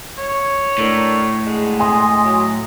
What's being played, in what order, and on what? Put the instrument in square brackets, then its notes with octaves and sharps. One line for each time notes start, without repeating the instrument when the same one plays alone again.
[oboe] C#5
[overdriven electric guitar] A2 [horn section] D4 A4 A#4
[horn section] D3 G#3 F#5
[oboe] D#5 [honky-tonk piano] G#5 C6
[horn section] F#3